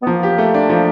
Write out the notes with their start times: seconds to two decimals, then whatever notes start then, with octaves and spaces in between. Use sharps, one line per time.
0.03 B3
0.06 F3 A#3
0.23 G4
0.38 A3
0.54 D4
0.70 F3